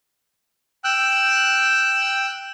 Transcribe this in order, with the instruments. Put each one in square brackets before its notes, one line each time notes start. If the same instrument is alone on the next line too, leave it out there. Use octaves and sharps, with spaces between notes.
[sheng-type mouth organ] G5 E6 F#6